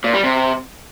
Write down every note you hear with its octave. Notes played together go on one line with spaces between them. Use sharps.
A#2
G3
C3